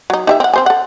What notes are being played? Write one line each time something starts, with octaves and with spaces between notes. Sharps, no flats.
F#3 D#4
D#4 G4 E5
C4 F#5
C4 C5 G#5
A4 F#5